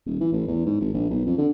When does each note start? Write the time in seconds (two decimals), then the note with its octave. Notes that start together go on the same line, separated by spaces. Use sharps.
0.07 D#1
0.21 E3
0.33 A1
0.47 E2
0.66 G#2
0.81 G#1
0.93 A#1
1.10 B1
1.26 F2
1.38 D3